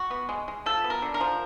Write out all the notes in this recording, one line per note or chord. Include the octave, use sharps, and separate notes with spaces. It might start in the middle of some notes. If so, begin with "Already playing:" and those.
Already playing: F#4
B3
G#3
G#3
F3 A4
B3
A#4
D3
A#4
F3